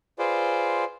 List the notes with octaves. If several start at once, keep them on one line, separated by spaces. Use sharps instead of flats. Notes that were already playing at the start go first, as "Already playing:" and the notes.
F4 G#4 B4 C5 D5